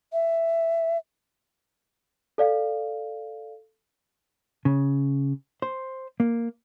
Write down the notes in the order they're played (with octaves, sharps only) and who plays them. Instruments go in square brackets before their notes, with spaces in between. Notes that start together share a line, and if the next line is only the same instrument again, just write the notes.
[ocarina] E5
[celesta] A4 D5 F5
[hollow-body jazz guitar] C#3
C5
A#3